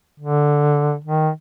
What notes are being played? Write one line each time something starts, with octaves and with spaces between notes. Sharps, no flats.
D3
D#3